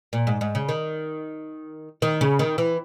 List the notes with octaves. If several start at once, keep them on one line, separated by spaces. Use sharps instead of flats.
A#2
G#2
G#2
C#3
D#3
D#3
C#3
D#3
E3